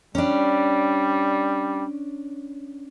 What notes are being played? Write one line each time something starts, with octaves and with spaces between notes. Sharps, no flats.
G3 C#4 D4